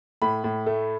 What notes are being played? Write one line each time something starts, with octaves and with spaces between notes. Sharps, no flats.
A2 B5
A2
A3